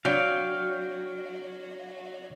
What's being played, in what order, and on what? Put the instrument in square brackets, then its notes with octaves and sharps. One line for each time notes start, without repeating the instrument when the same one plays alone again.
[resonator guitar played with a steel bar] F#3 [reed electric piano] D4 D5 [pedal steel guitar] F5 G5